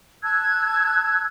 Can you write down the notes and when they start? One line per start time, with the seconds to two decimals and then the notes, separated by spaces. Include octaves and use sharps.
0.23 A5 E6 F#6 G#6